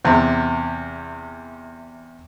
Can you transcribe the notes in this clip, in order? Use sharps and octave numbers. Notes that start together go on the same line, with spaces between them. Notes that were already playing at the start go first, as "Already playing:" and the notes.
E2 C3